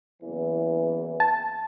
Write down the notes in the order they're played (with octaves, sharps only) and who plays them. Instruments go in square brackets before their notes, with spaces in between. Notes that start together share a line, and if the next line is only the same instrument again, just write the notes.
[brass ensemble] F#1 E2 E3
[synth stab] A5